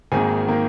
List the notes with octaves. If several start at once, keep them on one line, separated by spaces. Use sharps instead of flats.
G#1 G#2 D#3 A#3 G#5
D#3 A#3